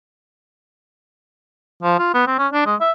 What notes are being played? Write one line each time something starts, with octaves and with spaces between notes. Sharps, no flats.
F3
F4
B3
C4
C#4
D4
G#3
E5